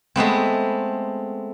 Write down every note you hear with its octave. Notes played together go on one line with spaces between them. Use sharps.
G#3 A3 B3 C4